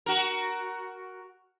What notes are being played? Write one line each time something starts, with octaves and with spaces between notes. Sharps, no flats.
F#4 A#4